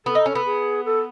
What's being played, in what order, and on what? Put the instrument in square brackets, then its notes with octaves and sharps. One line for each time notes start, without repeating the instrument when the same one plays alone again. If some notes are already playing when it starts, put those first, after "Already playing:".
[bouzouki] B3 [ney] A4
[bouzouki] D#4
C#4
B3
[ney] G#4
A4